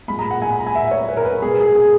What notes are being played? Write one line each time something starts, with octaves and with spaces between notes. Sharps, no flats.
A#2 G#3 B5
A#5
F#5
G#5
B5
A#5
G#5
E5
C#5
B4
A#4
B4
B2 G#3 G#4
G#4
G#4